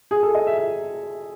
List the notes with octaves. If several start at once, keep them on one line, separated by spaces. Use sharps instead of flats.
G#4
A4
D#5
E5
E5